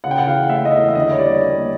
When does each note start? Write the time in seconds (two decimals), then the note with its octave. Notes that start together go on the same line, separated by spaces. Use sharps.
0.04 C#3 F#5
0.11 G5
0.18 F#5
0.27 E3 F5
0.49 A3 E5
0.65 D#5
0.72 E2 E5
0.88 E5
0.95 D3 D#5
1.12 C#5
1.19 G3 D5
1.41 A#3